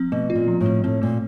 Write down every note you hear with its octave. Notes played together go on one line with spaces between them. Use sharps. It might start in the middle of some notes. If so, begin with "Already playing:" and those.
Already playing: F3 C4
B2 A3
F4
A#2
F3
A2
C4
A2 C4
A#2 A3